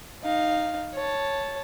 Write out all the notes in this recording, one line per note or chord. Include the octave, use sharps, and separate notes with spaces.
D#4 F5
C#5 A5